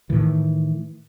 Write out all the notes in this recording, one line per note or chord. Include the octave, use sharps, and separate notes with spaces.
A2 D#3 E3